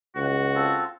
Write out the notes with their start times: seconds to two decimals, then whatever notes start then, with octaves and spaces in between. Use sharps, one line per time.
0.15 C#2 F#4
0.55 C4 F4 A4